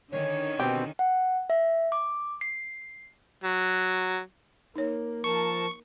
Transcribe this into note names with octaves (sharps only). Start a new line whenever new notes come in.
D3 D#3 C#4 C#5
B2 C4 G4
F#5
E5
D6
C7
F#3
A#3 D#4 C#5
F3 A#4 A5 C#6